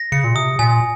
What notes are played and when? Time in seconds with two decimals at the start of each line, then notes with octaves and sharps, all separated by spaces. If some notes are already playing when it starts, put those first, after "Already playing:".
Already playing: A#6
0.12 C#3 C#7
0.24 A#2
0.35 C3 D#6
0.59 A#2 G#5